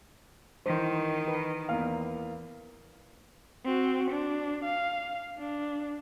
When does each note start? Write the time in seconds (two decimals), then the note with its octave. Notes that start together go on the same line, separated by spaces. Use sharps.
0.66 D#3 E3 C5
1.28 B4
1.69 E2 A#3 F5
3.65 C4 F#4
4.11 D4
4.64 F5
5.38 D4